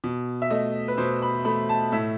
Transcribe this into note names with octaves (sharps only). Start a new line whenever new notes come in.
B2
E5
A3 D#5
B4
B2 C5
B5
A3 B5
A5
A2 E5